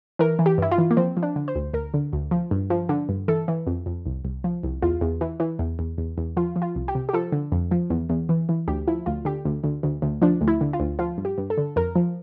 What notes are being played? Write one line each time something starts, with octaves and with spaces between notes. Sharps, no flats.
E3 A#4
E3
G4
G2 E4
F4
E3
A#3
F3 C4
F3
D4
D3
C5
D2
D2 A#4
D3
D2
F3
G2
F3
D3
G2
E3 A4
E3
F2
F2
C2
C2
F3
C2
E2 F4
E2
E3
E3
E2
E2
E2
E2
F3 F4
F3
F4
C2
G4
C3
G4
F3 A4
D3
F2
F3
E2
E2
E3
E3
D2 G4
F3 E4
D2 F4
D3 G4
D2
D2
D2
D2
F3 D4
D2
E4
D3
F4
D2
F3 F4
G2
G4
G2
A4
D3
F2 A#4
F3